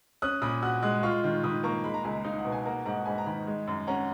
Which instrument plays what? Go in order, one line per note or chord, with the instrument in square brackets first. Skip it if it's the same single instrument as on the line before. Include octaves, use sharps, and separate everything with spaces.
[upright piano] C#4 [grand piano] D#6 F#6
[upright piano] A#2 [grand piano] B5 D#6
[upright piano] F#4 [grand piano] D#6 F#6
[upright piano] G#3 [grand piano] D#6 F#6
[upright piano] F4 [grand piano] C#6 F6
[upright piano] D#3
[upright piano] D#3 [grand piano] B5 D#6
[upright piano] A#3 [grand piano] A#5 C#6
[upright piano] G#3 [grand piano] B5
[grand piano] A#5
[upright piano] C#2 [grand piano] G#5 B5
[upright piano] D#4 [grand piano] F5
[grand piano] F#5
[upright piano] B2
[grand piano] G#5
[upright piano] A#3 [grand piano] F#5 A#5
[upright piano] G#2 [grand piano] F#5 A#5
[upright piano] G#2 [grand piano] G#5 B5
[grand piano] A#5
[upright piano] D#3 [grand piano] G#5 B5
[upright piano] G#3
F#2
[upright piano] C#4 [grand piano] F#5 A#5